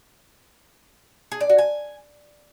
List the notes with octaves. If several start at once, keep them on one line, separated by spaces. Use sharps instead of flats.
G#4
D5
F#4
G#5